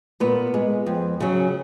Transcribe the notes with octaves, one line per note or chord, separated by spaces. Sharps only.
A#2 B3
G#3
F2
C#3 F#3